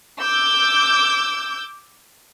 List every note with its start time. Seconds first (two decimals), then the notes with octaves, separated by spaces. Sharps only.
0.21 D6 E6 G6